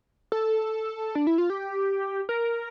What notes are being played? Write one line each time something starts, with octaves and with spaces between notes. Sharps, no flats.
A4
D4
E4
F4
G4
A#4